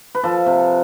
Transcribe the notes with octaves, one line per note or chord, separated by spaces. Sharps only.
B4
F3 A4
C3